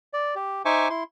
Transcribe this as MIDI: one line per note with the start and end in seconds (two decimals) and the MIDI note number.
0.13 0.35 74
0.35 0.62 67
0.65 0.88 63
0.65 0.88 72
0.65 0.88 76
0.65 0.88 80
0.65 0.88 85
0.65 0.88 86
0.90 1.04 64
0.90 1.04 84